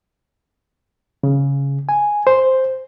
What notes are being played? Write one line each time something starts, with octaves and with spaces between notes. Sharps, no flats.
C#3
G#5
C5